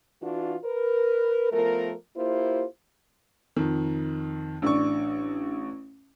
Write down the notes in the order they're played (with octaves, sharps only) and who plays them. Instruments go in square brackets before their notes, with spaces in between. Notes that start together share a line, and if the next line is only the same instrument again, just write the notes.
[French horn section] E3 D4 F4 F#4
A#4 B4
F3 A3 B3 A#4
A#3 E4 F4 G4 C5
[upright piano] F2 D#3
[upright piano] A1 D5 C#6 [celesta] D4 E6